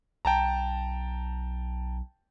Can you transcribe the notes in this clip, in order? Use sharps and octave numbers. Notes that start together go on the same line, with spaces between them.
B1 G5 A5 A#5